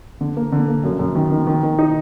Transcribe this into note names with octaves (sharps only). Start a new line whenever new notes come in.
D3
A#3
D3
A#3
F#2
F#2
D#3
D#3
D#3
D#3
D#4